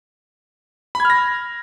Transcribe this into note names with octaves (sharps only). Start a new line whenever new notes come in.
B5 F6 G#6 A#6